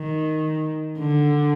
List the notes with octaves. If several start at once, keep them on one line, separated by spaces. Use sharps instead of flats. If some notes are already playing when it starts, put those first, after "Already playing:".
Already playing: D#3
D3